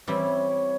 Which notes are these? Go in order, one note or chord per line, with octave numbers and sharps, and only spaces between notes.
E3 G3 C4 E4 C#5